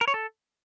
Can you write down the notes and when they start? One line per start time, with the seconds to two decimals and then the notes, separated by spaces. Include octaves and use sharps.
0.01 A#4
0.08 C#5
0.14 A4